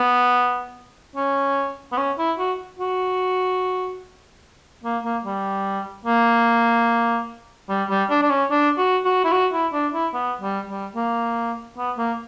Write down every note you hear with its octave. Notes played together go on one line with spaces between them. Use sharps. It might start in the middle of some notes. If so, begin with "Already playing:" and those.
Already playing: B3
C#4
B3
C#4
E4
F#4
F#4
A#3
A#3
G3
A#3
G3
G3
D4
D4
C#4
D4
F#4
F#4
E4
F#4
E4
D4
E4
B3
G3
G3
A#3
B3
A#3